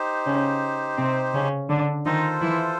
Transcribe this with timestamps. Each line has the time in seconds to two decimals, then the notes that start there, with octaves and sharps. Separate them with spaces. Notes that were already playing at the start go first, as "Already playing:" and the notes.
Already playing: D#4 G4 C5
0.26 C#3 C#4
0.98 C3 C4
1.34 C#3 C#4
1.69 D3 D4
2.05 D#3 D#4 F4 A4 C5
2.41 E3 E4